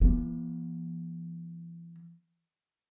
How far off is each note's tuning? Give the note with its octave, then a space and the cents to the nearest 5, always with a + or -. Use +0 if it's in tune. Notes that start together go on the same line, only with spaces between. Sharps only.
E3 +45 B3 -40